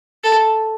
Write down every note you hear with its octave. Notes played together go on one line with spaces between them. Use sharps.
A4